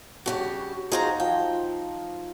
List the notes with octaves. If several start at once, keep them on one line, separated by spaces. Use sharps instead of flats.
G2 C#3 F#4 G4
D#4 F4 F#4 G#4 C5 A#5
F3 G5